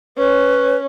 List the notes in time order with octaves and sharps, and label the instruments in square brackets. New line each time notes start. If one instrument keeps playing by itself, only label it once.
[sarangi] C#4 [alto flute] B4